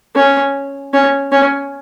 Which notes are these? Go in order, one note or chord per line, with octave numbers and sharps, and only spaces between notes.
C#4
C#4
C#4